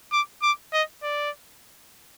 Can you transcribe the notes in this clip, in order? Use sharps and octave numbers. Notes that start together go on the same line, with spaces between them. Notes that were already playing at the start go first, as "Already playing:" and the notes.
D6
D6
D#5
D5